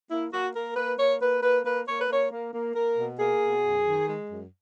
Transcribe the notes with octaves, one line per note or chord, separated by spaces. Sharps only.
A#3 E4
A#3 F#4
A#3 A#4
A#3 B4
A#3 C#5
A#3 B4
A#3 B4
A#3 B4
A#3 C#5
B4
A#3 C#5
A#3
A#3
A#3 A#4
B2
A#3 G#4
B2
F#2
D#3
G#3
F#2